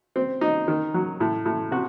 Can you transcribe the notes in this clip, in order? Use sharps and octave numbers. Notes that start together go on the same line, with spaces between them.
C4
D#4
D#3
F#3
A2
A2
C3 F#4